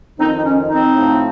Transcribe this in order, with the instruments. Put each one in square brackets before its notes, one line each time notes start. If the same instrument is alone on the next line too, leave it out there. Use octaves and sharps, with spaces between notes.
[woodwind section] F2 D#3 C4 D#4
D#4
C#4
C4 D#4
A2 F3